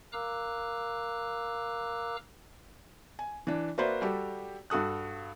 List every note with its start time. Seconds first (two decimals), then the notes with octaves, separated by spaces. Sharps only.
0.13 A#4 F5 A#5 D6 E6 F#6
3.19 G#5
3.47 E3 D4
3.78 A#3 F#4 B4 C5 D5 E5
4.02 G3 F#4 G4 A4
4.70 G2 F#4 A4 D#6 F#6